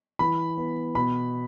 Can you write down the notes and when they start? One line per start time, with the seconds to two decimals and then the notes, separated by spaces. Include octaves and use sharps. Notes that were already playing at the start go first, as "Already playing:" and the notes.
0.19 E3 B5
0.58 B3
0.95 B2 B5